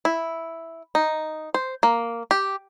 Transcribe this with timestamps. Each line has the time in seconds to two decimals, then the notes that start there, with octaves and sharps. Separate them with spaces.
0.05 E4
0.95 D#4
1.54 C5
1.83 A#3
2.31 G4